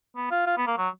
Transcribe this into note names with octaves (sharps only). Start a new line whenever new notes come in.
B3
F4
F4
B3
A#3
F#3